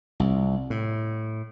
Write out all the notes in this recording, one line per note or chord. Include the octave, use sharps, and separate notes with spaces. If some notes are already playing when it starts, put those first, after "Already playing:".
C2
A2